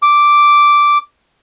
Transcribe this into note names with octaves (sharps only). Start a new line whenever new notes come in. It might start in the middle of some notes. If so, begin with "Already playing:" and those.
D6